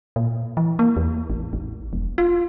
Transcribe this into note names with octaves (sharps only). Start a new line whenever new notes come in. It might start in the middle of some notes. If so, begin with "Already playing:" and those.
A#2
E3
A#3
E2
A1
A1
E1
F4